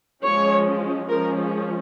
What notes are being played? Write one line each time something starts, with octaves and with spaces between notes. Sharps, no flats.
F3 G#3 C#4 C#5
F3 G#3 C#4 A#4